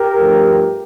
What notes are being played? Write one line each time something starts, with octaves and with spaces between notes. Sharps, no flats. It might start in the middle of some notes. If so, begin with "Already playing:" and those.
Already playing: G4 A#4
G2 F3 A3